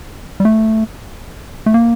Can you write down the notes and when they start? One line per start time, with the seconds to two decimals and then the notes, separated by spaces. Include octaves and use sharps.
0.40 G3
0.45 A3
1.66 A3
1.74 A#3